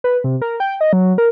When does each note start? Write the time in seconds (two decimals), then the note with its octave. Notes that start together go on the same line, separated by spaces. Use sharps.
0.04 B4
0.24 C3
0.42 A#4
0.60 G5
0.81 D#5
0.93 F#3
1.18 A#4